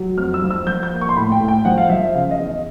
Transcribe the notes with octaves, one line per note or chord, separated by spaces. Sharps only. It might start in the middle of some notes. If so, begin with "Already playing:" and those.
Already playing: F#3
F2 F6
E6
F3
E6
F3 G6
G6
A#3
C#6
C6
A2 B5
G5
A2
G5
F3 F#5
F5
F3 E5
E5
C#3 F5
D#5
E2
D#5